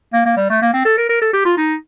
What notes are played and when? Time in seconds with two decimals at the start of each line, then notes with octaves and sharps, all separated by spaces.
0.13 A#3
0.26 A#3
0.37 G3
0.50 A3
0.62 A#3
0.74 C4
0.85 A4
0.97 A#4
1.09 A#4
1.22 A4
1.33 G4
1.45 F4
1.57 D#4